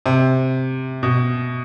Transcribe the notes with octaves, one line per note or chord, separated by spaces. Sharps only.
C3
B2